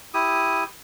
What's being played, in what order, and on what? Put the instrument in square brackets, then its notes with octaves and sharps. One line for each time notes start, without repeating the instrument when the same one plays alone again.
[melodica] E4 G4 D#6